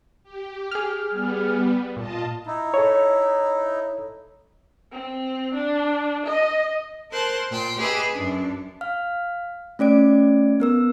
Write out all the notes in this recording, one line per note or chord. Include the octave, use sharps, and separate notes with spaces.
G4
G#4 F6
G3 B3
A#2 F4 D#5 A5
D#4 E4
A4 C#5
C4
D4
D#5
A#4 C5 A5 F#6
A#2 G5 C6
G4 G#4 B4 D#5 E5
F#2 D4
F5 F6
A3 C#4 D5 D7
B3 A#4 E6